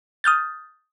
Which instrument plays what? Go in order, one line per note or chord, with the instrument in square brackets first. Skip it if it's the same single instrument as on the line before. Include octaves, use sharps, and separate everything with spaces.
[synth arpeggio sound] D#6 F6 G6 A6